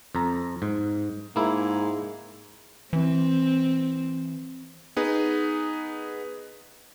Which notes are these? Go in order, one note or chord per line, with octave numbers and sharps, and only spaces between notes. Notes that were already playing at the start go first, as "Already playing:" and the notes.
F2 A#5
G#2
G#2 A#3 E4
E3 C4
B3 D#4 G#4 B4